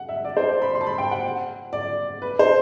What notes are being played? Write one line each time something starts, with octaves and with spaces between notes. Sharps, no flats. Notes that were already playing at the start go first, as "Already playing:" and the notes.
Already playing: F#5
E5
D5
C5
D5
B5
C6
A5
B5
G5
F#5
D5
B4
C5